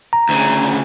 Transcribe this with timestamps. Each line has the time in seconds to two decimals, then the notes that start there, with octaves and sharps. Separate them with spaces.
0.13 A#5
0.29 D2 C#3